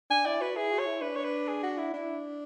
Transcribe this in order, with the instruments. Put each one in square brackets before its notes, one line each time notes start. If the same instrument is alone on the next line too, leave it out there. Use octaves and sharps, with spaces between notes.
[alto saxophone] D4 [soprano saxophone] G#5
[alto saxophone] E4 [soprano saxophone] D5
[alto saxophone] F#4 [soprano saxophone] B4
[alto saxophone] E4 [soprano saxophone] G#4
[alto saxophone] F#4
[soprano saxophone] C#5
[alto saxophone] E4
[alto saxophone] D4 [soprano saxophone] B4
[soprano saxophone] C#5
B4
G#4
F#4
E4
[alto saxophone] D4 [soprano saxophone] E4